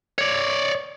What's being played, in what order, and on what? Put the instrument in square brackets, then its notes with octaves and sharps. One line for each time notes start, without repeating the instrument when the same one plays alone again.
[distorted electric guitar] C#5 D5